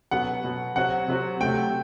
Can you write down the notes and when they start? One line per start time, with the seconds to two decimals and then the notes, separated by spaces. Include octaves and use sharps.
0.11 B2 F#3 B3 F#5
0.44 B2 F#3 B3
0.76 C3 F#3 C4 F#4 F#5
1.08 C3 F#3 C4 F#4
1.40 C3 F#3 A3 G5